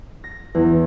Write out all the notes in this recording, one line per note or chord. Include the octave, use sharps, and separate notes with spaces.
A#6
E2